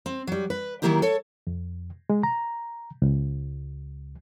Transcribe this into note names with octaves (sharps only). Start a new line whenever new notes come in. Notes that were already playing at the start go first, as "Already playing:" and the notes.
C4
F#3 G3
B4
D#3 F3 F#3 A#3 E4 G4
A4 C#5
F2
G#3
A#5
C#2